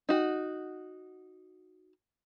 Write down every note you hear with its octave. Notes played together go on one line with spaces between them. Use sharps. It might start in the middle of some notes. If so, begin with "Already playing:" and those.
D#4 F#4